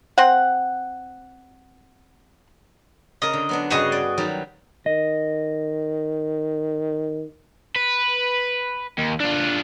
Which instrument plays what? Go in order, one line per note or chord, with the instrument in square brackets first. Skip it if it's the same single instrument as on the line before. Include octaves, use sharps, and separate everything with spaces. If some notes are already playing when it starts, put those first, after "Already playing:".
[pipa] C4 F#5
[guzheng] C#3 A#4 [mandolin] D#5
[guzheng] D3
F#3 B3 D4
[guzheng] G2 C#3 [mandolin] F#4 G#4 D#5
[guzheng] D5
D#3 F#3 G3
[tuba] D#3 [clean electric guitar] D#5
[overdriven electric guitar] B4
D#2
D4 F4